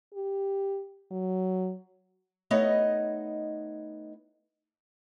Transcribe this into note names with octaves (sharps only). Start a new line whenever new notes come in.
G4
F#3
A3 B3 D#4 C#5 D#5